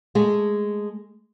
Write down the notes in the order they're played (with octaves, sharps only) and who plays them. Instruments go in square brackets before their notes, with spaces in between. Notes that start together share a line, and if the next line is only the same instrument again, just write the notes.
[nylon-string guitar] G#3 A3 G#4